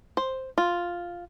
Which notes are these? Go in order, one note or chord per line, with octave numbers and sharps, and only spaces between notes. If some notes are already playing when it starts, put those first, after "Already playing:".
C5
F4